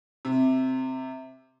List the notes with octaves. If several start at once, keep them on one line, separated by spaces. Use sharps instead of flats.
C3